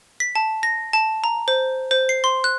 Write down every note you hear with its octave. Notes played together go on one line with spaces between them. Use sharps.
B6
A5
A#6
A5
A#5
C5
C5
C7
C6
F#6